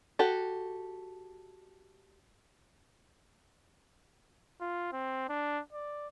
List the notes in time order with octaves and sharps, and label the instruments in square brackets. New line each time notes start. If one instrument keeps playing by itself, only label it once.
[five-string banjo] F#4 G4 A4
[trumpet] F4
C4
D4
D5